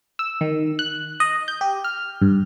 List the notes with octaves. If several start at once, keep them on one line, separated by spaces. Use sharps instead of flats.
E6
D#3
F#6
D#5
G6
G4
F6
G2